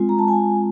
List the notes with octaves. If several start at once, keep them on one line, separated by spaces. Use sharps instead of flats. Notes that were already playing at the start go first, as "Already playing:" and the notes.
Already playing: G#3 C4 F4
A#5
A5
G#5